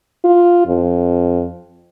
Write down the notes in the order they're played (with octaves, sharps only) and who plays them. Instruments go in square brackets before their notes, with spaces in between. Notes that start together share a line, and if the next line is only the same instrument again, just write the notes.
[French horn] F4
F2